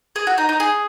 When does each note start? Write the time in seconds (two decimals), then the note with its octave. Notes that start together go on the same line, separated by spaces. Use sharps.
0.16 G#4
0.27 F#4
0.38 D#4
0.49 D#4
0.60 G#4